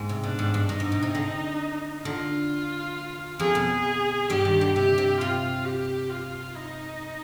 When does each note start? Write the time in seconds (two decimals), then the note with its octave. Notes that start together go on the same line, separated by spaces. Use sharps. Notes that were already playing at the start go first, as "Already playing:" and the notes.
Already playing: G#2 G#3
0.09 C3
0.23 B2 D4
0.39 G#2
0.54 G2
0.69 G2 D#4
0.80 G#2
0.92 B2
1.02 C3
1.15 D3
2.05 D3 F4
3.39 F2 F3 G#4
3.55 B2 B3
4.30 G2 G3 G4
4.45 D#3
4.61 D3
4.76 C3 G4
4.98 C3
5.20 C3 F4
5.65 G4
6.10 F4
6.56 D#4